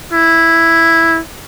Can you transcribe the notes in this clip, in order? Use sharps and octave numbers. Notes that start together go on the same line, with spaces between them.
E4